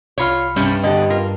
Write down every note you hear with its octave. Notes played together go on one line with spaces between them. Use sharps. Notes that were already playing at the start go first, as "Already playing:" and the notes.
C2 F4 C#5 B5 F6
G2 C3 G3 C#4
D3 B3 G4 D#5
F4 A#4